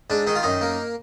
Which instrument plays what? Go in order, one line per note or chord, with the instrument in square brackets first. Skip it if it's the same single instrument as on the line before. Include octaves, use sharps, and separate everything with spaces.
[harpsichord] G#2 D4
D#3 D#4
F4
F#2 D#4
A#3